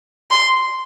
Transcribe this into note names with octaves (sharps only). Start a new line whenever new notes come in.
C6